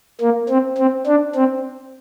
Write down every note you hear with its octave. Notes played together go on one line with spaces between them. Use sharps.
A#3
C4
C4
D4
C4